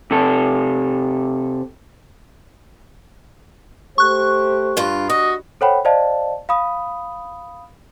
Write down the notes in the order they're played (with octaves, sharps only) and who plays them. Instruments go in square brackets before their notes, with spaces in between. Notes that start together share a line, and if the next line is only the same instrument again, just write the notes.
[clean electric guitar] C3 A4
[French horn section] A3 G4 C5 [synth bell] C#6 F#6
[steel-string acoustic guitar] G2 F4
[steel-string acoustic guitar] F#4 [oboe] D#5
[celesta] A4 C5 C#5 F#5 G5 B5
C5 D5 D#5 F5 A5
F5 B5 D#6